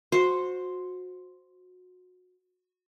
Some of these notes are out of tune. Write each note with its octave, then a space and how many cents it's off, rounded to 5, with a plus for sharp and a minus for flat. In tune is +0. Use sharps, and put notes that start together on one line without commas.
F#4 -25 C5 +0